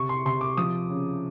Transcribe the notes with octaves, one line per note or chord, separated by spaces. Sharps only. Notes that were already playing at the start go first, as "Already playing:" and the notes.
Already playing: C3 C#6
C6
C3 C6
D6
F3 D#6
C#3